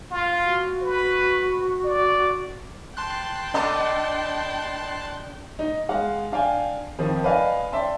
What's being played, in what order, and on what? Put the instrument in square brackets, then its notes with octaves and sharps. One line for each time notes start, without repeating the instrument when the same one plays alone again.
[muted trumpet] F4
[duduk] F#4
[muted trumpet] B4
D5
[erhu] G5 [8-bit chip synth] A5 C6 F#6
[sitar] B3 A4 D#5 [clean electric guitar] D4
[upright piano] D#4
G#3 F5 F#5
D4 F5 G5 G#5
F2 D#3 F3
B4 D5 D#5 F5 G#5
D5 E5 G5 A5 C6